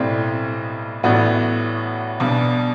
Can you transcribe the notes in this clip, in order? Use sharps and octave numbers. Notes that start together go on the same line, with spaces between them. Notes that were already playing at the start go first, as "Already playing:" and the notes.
Already playing: B1 A2 G3 C4
A1 A2 G3 B3 F#4
B1 B2 G3 D4